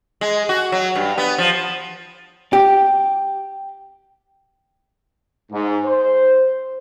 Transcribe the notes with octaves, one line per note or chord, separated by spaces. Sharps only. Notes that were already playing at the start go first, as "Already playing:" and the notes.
G#3
F#4
F#3
G2
B3
F3
G4
G#2
C5